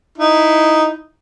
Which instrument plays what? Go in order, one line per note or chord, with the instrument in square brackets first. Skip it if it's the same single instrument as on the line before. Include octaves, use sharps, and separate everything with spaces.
[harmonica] D#4 E4